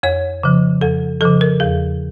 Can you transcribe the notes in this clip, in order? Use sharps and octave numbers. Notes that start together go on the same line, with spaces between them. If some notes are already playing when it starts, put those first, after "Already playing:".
F2 C#5
C#3 F3
F2 A4
C#3 F3 A4
A#4
E2 G#4